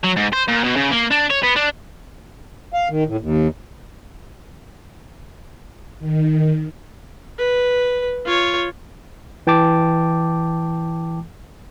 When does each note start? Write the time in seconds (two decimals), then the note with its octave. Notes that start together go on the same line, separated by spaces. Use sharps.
0.04 F#3
0.17 G#2
0.33 C5
0.48 A#2
0.64 B2
0.77 C#3
0.92 A#3
1.11 D4
1.31 C#5
1.44 B3
1.56 D4
2.73 F5
2.89 D#3
3.07 A2
3.20 D#2
5.99 D#3
7.38 B4
8.26 F4 C#5
9.47 E3 G5 A5 D6